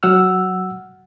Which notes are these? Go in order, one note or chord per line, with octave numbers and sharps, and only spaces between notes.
F#3 F#5 E6 F6